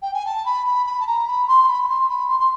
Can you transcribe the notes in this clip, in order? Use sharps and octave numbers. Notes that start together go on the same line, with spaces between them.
G5
G#5
A5
B5
B5
B5
A5
A#5
B5
C6
C6
B5
C6
B5
C6
C6